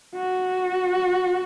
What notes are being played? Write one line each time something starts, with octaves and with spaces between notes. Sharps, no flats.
F#4